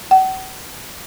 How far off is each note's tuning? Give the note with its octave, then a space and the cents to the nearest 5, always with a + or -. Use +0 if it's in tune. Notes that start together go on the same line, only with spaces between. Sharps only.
F#5 +40